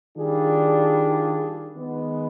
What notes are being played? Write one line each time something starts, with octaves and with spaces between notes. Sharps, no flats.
D#3 G3 D4 F4 G#4
D#3 G#3 B3